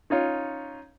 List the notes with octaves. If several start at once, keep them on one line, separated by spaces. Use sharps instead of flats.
C#4 D#4 F4 C#5